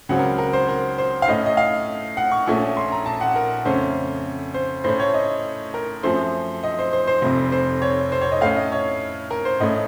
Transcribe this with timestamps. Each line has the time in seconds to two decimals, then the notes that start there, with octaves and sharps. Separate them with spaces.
0.09 C#2 C#3 F#3 C4 F#5
0.19 A#4
0.38 A#4
0.53 C5
0.68 A#4
0.98 C5
1.22 F5
1.28 A2 A3 C#4 D#5
1.46 D#5
1.57 F5
2.17 F#5
2.32 C#6
2.46 A#1 A#2 A3 C#4 C#6
2.77 C6
2.92 A#5
3.06 A5
3.21 F#5
3.36 A#4
3.65 F2 C#3 A3 C#4 C5
4.54 C5
4.84 A2 A3 C#4 C5
5.00 C#5
5.14 D#5
5.74 A#4
6.03 F#2 F3 A3 C4 C5
6.64 D#5
6.79 C5
6.93 C5
7.07 C5
7.22 F1 F2 C3
7.52 C5
7.82 C#5
8.12 C5
8.22 C#5
8.32 D#5
8.41 A2 A3 C#4 F5
8.56 D#5
8.72 C#5
9.31 A#4
9.45 C5
9.60 A1 A2 A3 C#4 D#5